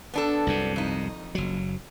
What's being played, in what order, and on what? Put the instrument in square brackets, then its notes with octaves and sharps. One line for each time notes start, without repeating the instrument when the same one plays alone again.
[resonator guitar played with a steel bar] B3 D4 A4
[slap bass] C2 F#2 C3
[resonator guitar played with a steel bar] F2 D#4
[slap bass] F#1 F#3